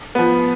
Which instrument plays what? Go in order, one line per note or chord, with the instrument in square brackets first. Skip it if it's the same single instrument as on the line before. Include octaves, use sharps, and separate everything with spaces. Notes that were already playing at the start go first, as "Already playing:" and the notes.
[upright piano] F3 B3